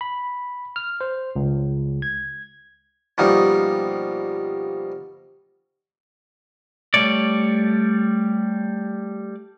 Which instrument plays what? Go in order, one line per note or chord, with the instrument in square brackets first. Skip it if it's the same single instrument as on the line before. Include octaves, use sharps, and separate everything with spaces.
[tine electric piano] B5
F6
C5
C#2
G#6
[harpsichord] B2 F3 G3 A#3 D#4
[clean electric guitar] G3 A3 C#5 D5